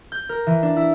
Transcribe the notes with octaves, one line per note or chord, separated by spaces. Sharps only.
G6
A#4
E3
D4
E4